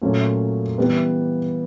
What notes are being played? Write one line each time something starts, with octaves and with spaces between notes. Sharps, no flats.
A#2 F#3 A3 C#4
E3 G3 B3